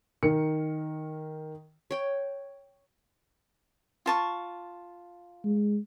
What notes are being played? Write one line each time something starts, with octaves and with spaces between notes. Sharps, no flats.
D#3 A#4 C#7
C#5 G5
F4 A5 C#6
G#3